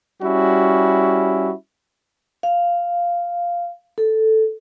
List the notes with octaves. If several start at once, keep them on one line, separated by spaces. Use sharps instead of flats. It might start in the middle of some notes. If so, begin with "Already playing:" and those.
G3 C#4 E4 F#4
F5
A4